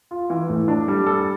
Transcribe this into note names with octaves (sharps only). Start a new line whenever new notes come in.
F4
E3
A2
D4
G3
A4